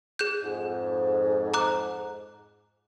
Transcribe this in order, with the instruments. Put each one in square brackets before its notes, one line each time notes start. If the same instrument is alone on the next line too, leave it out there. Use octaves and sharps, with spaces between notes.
[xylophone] G#4 F#6 G6
[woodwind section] F2 G#2
[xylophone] A#5 D6 F#6